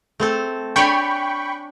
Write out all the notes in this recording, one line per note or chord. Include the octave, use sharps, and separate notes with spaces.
A3 C4 A4
D4 C#5 G5 G#5 B5 C#6